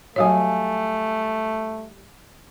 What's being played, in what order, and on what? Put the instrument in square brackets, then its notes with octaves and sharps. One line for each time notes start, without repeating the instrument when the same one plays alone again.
[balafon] F#3 F#4 C#5 [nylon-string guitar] G3 F5 G#5 [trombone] A3